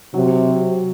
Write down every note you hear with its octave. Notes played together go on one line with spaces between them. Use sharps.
C3 F#3